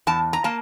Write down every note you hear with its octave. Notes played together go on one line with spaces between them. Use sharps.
E2 A5
A#5
A#3 A5